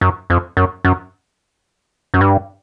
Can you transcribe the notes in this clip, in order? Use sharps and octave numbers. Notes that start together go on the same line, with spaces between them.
F#2
F2
F#2
F#2
F#2
G2